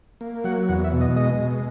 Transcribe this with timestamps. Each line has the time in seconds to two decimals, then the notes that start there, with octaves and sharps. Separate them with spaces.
0.21 A#3
0.44 F#3 F#5
0.69 E2 F#5
0.84 E5
0.92 B2
1.01 D#5
1.16 G#3 D#5
1.40 B2